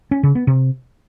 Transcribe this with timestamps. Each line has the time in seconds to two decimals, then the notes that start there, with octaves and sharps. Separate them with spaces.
0.11 C#4
0.23 C#3
0.35 B3
0.47 C3